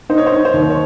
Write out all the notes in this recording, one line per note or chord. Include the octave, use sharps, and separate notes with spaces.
D#4 C5
C#5
C5
D#4 C#5
C5
D#2 C#5
C5
C#5